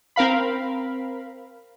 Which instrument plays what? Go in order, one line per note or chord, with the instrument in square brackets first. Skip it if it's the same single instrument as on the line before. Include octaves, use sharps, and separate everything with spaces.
[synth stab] C4 A#4 F5 B5